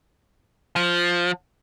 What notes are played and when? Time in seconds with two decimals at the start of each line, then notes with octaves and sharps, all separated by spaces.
0.76 F3